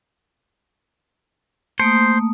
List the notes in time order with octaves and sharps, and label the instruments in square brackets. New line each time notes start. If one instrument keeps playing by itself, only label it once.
[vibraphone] A3 A#3 D#6 [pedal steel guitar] C5